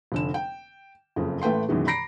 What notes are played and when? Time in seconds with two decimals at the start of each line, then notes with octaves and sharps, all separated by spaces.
0.12 F1 D3 E7
0.34 G5
1.16 F#1 F2 C#3
1.42 A1 A3 B4 G5 C6
1.68 F#2 B2 D#3 E3 G#3
1.87 A#5 B5 A#6 C7 D7